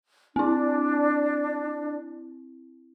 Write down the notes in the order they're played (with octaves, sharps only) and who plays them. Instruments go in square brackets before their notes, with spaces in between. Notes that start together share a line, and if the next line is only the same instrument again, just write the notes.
[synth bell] C4 E4 [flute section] D4